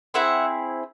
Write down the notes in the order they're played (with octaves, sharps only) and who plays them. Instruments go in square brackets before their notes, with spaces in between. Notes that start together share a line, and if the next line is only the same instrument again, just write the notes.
[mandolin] C4 E4 G#4 E5 F#5